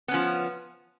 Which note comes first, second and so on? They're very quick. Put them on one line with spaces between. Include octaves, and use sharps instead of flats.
B3 C#4 F3